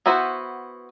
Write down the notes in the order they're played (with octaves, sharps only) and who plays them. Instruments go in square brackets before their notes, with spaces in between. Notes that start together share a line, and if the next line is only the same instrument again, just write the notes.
[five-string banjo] B3 E4 F#4 B4 C5